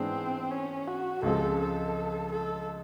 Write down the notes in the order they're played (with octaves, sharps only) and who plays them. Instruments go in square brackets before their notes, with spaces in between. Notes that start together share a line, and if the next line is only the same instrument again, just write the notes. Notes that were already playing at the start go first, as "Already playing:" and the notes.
Already playing: [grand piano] G#2 E3 G#3 B3 D4 [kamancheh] C4
[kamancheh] C#4
F#4
[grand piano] C#2 C#3 F3 G#3 C4 [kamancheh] A4
[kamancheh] A4
A4